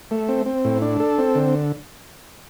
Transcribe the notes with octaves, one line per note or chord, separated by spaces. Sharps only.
A3
C4
C4
A2
D4
A4
C4
D3